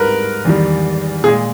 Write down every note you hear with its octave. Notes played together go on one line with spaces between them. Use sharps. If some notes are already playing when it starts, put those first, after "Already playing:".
Already playing: G#2 G3 A#4 B4
E2 D#3 G3
A#2 G#3 G#4